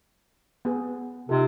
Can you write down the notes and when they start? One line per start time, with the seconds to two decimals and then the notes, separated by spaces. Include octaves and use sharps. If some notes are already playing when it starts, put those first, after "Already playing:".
0.65 B3 G#4
1.29 C3 D#4 F4 A4